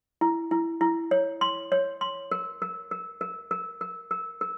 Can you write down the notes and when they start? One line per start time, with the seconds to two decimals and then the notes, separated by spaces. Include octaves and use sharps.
0.21 E4
0.51 E4
0.81 E4
1.11 C#5
1.41 C6
1.72 C#5
2.01 C6
2.31 A#4
2.62 A#4
2.91 A#4
3.21 A#4
3.51 A#4
3.81 A#4
4.11 A#4
4.41 A#4